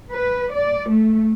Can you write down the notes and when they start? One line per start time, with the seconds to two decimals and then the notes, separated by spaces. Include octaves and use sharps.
0.11 B4
0.52 D5
0.90 A3